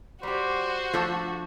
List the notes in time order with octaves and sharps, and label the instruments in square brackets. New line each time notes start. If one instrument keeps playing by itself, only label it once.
[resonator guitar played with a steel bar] G3 G4 [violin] F#4 [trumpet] C5
[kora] F3 D4 [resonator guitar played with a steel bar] A3